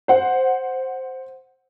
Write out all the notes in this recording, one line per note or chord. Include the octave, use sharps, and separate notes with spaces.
C5 F#5